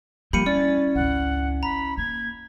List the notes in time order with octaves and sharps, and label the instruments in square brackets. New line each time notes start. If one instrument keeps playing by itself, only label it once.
[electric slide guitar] F3 A#3 G4 [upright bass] G3 [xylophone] B5 C#7 D#7
[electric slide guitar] C#4 E4 [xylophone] D5 [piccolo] A6
[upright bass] G#1 C#2 [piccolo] F#5
[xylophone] A#5 [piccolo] B5
[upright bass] A#3 [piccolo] G#6